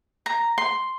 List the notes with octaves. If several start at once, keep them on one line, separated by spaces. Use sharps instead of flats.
A#5
C6